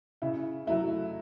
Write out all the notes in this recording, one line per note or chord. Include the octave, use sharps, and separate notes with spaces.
C#3 E4
F#3 A3 E4